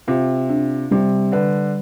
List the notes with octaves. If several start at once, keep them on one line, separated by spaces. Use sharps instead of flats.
C3 F4
D4
C3 G3
D3 B4